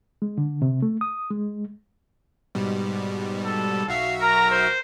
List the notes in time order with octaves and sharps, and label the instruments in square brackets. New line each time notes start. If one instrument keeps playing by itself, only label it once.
[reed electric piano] G#3
D3
C3
A3
D#6
G#3
[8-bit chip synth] G#2 B2 G3
[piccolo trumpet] A4
[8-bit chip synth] B1 F#4 E5 [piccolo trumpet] F5
[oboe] A#4 [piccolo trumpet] A#5
[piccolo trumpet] C5